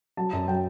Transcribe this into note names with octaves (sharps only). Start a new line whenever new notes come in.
F#3 A5
F#2 A5
F#3 G5